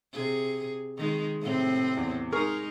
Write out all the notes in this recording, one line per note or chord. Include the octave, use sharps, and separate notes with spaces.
C3 G#4
D#3 G#3
A2 C3 C4
E2
G#3 D#4 G#4 A#4 C#6